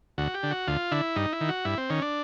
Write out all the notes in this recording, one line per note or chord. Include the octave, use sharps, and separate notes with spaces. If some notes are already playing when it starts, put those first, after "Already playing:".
D2 F#4
G4
D3
F#4
D2 F4
D3 E4
G2 D#4
E4
D#3
F#4
G2 E4
C4
D#3 C#4
D4